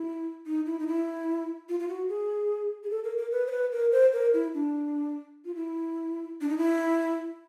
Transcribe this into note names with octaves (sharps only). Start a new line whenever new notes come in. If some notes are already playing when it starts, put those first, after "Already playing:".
Already playing: E4
D#4
E4
D#4
E4
F4
F4
F#4
G#4
G#4
A4
A#4
A#4
B4
C5
B4
A#4
C5
A#4
E4
D4
F4
E4
D4
D#4
E4